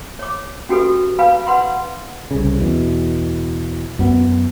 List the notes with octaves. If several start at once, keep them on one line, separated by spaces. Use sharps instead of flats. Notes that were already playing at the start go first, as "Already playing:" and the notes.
C#5 D6
C#4 F#4 G4 A4 B4
B4 F5 G#5 B5
B4 F#5 B5 C6
C2 C#3
E2 B2
F#2 B3